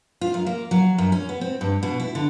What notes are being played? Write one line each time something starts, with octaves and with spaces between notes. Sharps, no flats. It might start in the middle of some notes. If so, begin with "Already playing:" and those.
F4
F#2
A#3
F#3
F#2
C#4
B3
C4
G2
B2
E4
D3